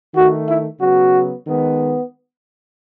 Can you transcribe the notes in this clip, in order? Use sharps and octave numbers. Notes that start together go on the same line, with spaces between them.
D#3 A3 F#4
E4
C#3 F#3 B3 F#4
D#3 G#3 B3